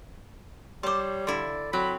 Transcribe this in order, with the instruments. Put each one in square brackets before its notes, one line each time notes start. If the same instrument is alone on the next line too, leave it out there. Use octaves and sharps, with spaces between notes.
[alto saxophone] G3 [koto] C5 A5 [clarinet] C#5 [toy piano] C6 D6
[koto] D3 E4 [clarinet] D5 [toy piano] E5 F5 C6
[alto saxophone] F#3 [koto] C4 [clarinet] B5